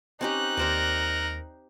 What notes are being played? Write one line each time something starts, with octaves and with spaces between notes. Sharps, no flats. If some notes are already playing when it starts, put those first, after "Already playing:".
C4 C#4 D#4 G4 F#6
D#2 G4 A#4 C5 D5